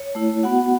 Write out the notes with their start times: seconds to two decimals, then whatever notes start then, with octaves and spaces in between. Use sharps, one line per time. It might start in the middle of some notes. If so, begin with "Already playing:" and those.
Already playing: C#5
0.15 A3 E4
0.43 B3 F#4 F#5